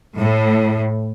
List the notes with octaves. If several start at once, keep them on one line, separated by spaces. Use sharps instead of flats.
A2